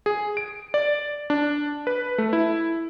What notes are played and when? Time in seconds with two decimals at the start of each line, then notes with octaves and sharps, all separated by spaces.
0.06 G#4
0.37 D7
0.74 D5
1.30 D4
1.87 B4
2.18 A3
2.33 E4